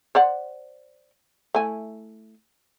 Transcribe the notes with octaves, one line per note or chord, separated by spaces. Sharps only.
C5 D5 F#5
A3 E4 G#5